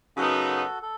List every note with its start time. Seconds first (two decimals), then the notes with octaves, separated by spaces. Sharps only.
0.17 F#2 C#3 F#3 B3 D#4 F#4 A4
0.82 A4